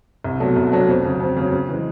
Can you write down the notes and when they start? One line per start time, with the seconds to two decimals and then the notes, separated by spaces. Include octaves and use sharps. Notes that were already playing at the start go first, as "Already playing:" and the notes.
0.24 C2
0.40 B2 F#3 A3 D4
0.56 C2
0.72 B2 F#3 A3 D4
0.88 F2
1.04 C#3 F#3
1.20 F2
1.37 C#3 F#3
1.52 C#3
1.69 E3 G#3